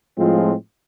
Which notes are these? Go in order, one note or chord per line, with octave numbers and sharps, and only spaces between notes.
A2 F3 G#3 C4 F4